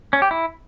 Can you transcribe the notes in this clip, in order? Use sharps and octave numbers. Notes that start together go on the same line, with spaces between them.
C#4
G4
E4